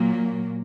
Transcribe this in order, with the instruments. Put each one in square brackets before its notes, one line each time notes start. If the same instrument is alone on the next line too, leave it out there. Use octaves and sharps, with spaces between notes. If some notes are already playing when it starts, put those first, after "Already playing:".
Already playing: [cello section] A#2 F#3 A#3